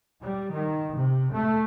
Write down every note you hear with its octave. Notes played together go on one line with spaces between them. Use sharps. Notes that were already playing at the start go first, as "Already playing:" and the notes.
G3
D#3
C3
A3